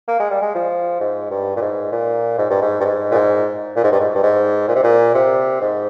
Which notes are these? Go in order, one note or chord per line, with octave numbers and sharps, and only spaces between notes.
A#3
G#3
G3
G#3
F3
G#2
G2
A#2
G#2
A#2
G#2
G2
G#2
G2
G#2
A#2
G#2
A#2
G#2
G2
G#2
G2
G#2
A#2
C3
A#2
C3
G#2